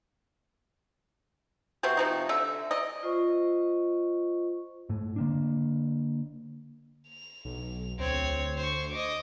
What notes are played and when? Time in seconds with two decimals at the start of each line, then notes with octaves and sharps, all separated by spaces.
1.83 C3 B3 F#4 C5
1.97 C3 F3 D#4
2.29 D3 E5
2.71 D5 D#5
3.03 F4 C5 D#5 C#6
4.90 G#2 A3
5.16 D3 A#3 D4
7.08 F7
7.45 B1
7.99 D2 C4 C#5
8.57 C5 C#6
8.91 D#5 D6